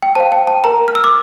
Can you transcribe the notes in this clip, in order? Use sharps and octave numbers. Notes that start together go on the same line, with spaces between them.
G5
C5 F5 A5
G5
A5
A#4 A#5
F6
E6
D6